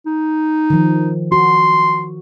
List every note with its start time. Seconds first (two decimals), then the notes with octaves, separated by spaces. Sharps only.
0.06 D#4
0.70 D#3 F3
1.32 F#4 C6